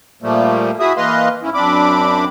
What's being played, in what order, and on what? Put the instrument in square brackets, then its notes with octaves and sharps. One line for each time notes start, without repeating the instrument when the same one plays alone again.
[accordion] A#2 F3 G3 A3 A#3
E4 F#4 G#4 E5 D#6
E3 A#3 B4 D#5 F5 C6
G#2 C#4 E4
F#2 C4 D4 B5 D6